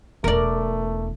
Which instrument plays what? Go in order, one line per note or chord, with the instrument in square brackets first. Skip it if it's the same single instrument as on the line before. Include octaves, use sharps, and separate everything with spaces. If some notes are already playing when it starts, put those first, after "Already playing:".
[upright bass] E1 E2 [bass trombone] A3 [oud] A#4 D5